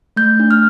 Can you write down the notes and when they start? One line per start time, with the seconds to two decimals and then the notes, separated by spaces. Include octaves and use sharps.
0.16 A3 G6
0.40 D4
0.51 F6